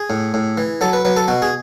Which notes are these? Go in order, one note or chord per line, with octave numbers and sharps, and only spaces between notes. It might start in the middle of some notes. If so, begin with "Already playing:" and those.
Already playing: G#4
A2
A2
E3
F#3 A4
B4
F#3 B4
A4
B2 F#4
G#4